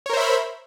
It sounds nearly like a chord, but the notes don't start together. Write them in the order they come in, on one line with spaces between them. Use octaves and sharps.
C#5 A#4 C5 E5 B5